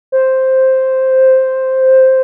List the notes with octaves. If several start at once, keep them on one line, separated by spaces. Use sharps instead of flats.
C5